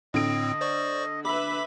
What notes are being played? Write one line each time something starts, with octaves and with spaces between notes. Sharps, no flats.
A2 D3 C4 D#5 D7
C5 D5 C#6
B4 E5 B5 D6